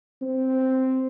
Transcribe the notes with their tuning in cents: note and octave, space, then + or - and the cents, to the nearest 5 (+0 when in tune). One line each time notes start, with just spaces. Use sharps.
C4 -5